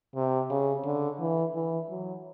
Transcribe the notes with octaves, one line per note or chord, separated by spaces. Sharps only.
C3
C#3
D3
E3
E3
F#3